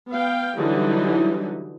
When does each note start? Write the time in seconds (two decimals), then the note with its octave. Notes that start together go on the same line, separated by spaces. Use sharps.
0.10 B3 F5 G5
0.58 D3 E3 F#3 G3 D#4 E4